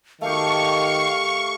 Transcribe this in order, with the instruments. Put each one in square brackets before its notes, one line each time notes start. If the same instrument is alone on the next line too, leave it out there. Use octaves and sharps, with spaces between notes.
[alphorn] D#3 [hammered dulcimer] A3 G4 [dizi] F5 [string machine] C#6